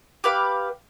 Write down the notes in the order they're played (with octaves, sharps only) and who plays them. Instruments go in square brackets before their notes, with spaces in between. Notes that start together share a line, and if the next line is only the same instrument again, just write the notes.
[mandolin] G4 B4 F5 D6